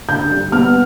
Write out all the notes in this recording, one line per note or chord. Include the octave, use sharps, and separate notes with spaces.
D3 G6
G3
B3 F6